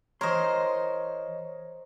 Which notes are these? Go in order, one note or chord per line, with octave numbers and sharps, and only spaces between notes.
E3 A#4 C5 C#5 D#5 C6